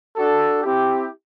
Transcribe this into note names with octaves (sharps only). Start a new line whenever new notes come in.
D4 F#4 A4
C4 E4 G4